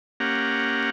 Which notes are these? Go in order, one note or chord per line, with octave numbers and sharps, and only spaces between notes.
A#3 C#4 G4 F#5 A#5